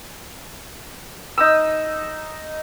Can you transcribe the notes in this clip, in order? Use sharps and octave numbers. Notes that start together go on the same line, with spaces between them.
D#4 D#6 E6